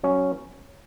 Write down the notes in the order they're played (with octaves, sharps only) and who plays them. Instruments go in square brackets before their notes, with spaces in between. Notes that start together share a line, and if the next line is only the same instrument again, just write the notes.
[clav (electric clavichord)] F#3 C#4